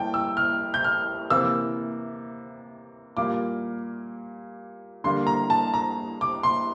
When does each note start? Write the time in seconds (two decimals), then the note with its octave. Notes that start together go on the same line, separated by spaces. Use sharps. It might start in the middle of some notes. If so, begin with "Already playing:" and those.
Already playing: A2 G3 A#3 G5 A5
0.14 E6
0.37 F6
0.74 G6
0.84 F6
1.30 C3 E3 A#3 E6
3.17 A#2 G3 A#3 D6
5.04 D3 G3 A#3 C6
5.27 A#5
5.50 A5
5.74 A#5
6.21 D6
6.43 C6